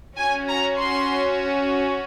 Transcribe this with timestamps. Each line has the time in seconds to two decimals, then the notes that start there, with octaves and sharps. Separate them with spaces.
0.17 C#4 F#4 G#5
0.48 A#5
0.78 C6